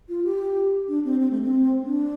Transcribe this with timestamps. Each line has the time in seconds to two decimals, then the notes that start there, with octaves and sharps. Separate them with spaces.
0.09 F4
0.25 G4
0.88 D4
1.05 C4
1.20 C4
1.31 A3
1.42 C4
1.84 D4